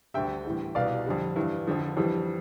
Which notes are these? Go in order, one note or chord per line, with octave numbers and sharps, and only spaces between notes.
D2 D3 G3 E5 G5
A2 E3 G3
C2 B2 G3 D5 F5
F2 D3 G3
G2 E3 G3
F2 D3 F3
F2 E3 G3